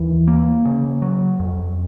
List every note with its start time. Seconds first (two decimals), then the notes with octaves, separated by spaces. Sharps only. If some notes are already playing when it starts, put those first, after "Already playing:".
Already playing: D#2 E3
0.28 A#3
0.65 C#3
1.02 F#3
1.40 F2